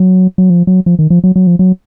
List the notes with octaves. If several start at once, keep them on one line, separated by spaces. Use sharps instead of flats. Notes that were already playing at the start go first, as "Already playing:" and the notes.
Already playing: F#3
F#3
F3
F#3
F3
D#3
F3
F#3
F#3
F3
F#3